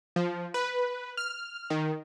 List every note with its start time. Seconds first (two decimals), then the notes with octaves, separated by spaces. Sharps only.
0.16 F3
0.54 B4
1.17 F6
1.70 D#3